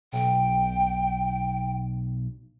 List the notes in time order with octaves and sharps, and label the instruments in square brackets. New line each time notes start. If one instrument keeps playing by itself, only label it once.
[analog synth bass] B1 [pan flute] G5